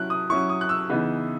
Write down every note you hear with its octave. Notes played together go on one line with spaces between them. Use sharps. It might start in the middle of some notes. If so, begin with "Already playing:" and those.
Already playing: F#3 C#4 E4 F#6
D#6
F#3 C#4 E4 C#6
D#6
F#6
E6
C#3 E3 B3 D#4